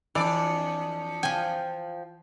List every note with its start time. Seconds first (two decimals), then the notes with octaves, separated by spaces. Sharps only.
0.15 F2 E3 D4 D5
1.23 F3 G5 G#5